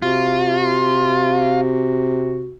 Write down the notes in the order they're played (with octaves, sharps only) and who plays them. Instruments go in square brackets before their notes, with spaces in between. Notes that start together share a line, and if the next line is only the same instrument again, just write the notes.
[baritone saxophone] C3 [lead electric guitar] F4 [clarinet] F#4